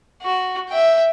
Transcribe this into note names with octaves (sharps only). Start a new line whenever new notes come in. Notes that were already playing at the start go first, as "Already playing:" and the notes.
F#4
E5 G5